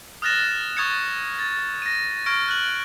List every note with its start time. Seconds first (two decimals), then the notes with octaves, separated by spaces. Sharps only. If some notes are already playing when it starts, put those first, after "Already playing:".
0.22 D#6 F6 F#6 A6 A#6 E7
0.77 C#6 D#6 G#6 A6 C#7
1.39 A6
1.82 A#6 D#7
2.26 C#6 F6 G#6 A#6 D7
2.48 F#6 F#7